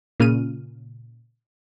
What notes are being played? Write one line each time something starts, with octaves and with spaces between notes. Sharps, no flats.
A#2 C#3 F6 D#7